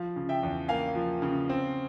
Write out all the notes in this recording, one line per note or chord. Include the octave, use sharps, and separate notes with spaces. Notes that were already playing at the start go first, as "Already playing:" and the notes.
Already playing: F3 F5
C#3
E5 G5
E2
A#3 F5 G#5
F3
C#3
C4